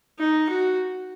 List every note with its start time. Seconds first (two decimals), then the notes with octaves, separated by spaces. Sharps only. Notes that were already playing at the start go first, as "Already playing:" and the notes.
0.19 D#4
0.49 F#4